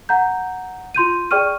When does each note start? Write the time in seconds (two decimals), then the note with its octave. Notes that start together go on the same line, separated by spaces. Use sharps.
0.09 F#5 A#5 G6
0.95 F4 C6 G6 D#7
1.31 G#4 D5 G5 C#6 F6 D#7